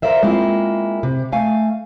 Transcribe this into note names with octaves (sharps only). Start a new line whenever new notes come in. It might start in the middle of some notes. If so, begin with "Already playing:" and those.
A#4 C5 D5 E5 F5
G#3 A#3 C4 E4 F4
C3
A3 F5 G#5